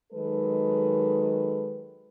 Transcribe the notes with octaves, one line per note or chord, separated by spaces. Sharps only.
D#3 F#3 G#3 A4 B4